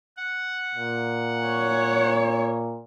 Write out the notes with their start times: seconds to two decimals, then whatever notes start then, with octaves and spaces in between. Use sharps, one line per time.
0.17 F#5
0.75 A#2
1.47 C#5